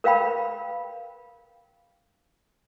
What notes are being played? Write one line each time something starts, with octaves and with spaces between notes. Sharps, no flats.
A#4 B4 F5 G5 B5